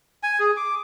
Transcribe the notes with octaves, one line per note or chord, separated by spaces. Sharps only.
G#5
G#4
D6